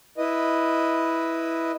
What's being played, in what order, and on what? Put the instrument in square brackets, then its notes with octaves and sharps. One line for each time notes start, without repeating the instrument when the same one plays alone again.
[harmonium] E4 B4 D#5